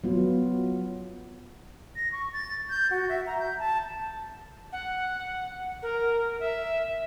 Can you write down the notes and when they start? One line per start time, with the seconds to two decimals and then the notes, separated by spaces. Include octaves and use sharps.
0.04 F#3 B3 F4
1.96 A#6
2.12 C#6
2.33 A6
2.70 G6
2.91 F#4
3.09 E5
3.27 A#5
3.39 G6
3.59 A5
4.72 F#5
5.82 A#4
6.40 E5